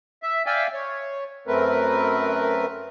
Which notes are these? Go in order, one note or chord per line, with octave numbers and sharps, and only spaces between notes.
E5
D5 E5 F5 G5 G#5
C#5
F#2 A3 C4 A#4 B4